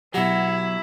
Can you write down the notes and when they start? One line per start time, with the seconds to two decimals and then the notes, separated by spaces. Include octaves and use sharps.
0.14 B2 F#3 E4 G4 F#5